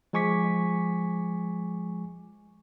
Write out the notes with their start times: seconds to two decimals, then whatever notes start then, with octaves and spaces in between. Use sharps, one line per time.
0.13 F3 G#3 G#5 C#6 D6 B6